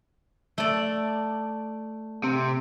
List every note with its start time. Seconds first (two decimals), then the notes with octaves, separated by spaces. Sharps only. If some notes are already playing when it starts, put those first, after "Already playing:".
0.58 A3 D5
2.24 C3